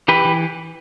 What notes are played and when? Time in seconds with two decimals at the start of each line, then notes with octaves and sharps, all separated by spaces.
0.08 E3 G4 B4
0.25 E3